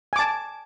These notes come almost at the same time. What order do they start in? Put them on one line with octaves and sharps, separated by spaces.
G#5 D6 A5